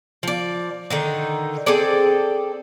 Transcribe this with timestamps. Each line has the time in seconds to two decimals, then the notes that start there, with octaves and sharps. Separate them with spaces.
0.23 F3 D5
0.90 D3 D#3 D#4
1.66 C4 G#4 A4 D5